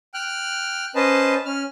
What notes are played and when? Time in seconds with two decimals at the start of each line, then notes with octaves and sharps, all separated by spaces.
0.14 G5 F6 F#6
0.95 C#4 B4 C5 D#5 A5
1.45 C#4 F6